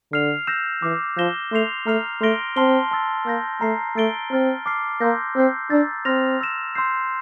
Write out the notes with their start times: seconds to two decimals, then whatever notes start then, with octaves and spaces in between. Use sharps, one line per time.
0.12 D3 F6 C7 F7
0.47 E6 G6 A#6 E7
0.82 E3 D6 F6 C7
1.17 F3 G6 A#6 E7 G7
1.52 A3 C6 G6 C7 F7
1.87 A3 A#5 F6 C7 F7
2.21 A3 C6 F6 A#6 D7 G7
2.57 C4 A5 C6 F6 C7 G7
2.91 A5 C6 E6 A6
3.26 A#3 E6 G6 A#6
3.61 A3 A#5 F6 C7
3.96 A3 E6 A6 D7 G7
4.31 C4 A#5 F6 A6
4.66 A5 D6 F6 C7
5.01 A#3 C6 E6 G6 A#6
5.36 C4 E6 G6 C7
5.70 D4 A#5 E6 A6
6.05 C4 C6 F6 A#6 F7
6.41 E6 A#6 E7
6.75 C6 E6 G6 C7